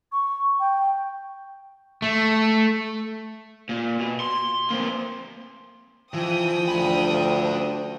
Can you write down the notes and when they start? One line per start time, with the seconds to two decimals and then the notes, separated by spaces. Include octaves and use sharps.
0.12 C#6
0.59 G5
2.02 A3
3.69 A#2
3.99 B2
4.20 C6
4.70 A#3 C4
6.14 E3 F3 G5 D#6
6.68 D2 D4 B5